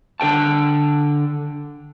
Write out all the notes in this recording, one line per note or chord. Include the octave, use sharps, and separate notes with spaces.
D3 A4 G5 A5